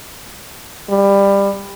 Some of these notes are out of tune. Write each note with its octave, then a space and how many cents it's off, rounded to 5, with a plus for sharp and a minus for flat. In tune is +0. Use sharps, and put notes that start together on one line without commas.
G3 +20